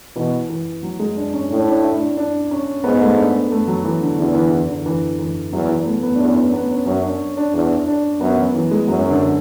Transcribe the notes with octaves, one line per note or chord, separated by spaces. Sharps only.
B2 E3
E3
F#3
G#3
D4
C#4
A2 D4
D4
E4
D4
D4
C#4
G#2 B3
A3
D4
A3
F#3
E3
D3
E2 D3
E3
E3
D3
E3
E3
E2 F#3
E3
B3
A3
B3
D4
E2 C#4
B3
B3
C#4
F#2 C#4
D4
D4
E2 D4
D4
F#2 B3
F#3
E3
G#3
F#2 F#3
D3